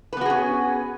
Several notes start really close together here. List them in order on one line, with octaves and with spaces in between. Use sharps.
B4 B3 F#4 G#4 C#4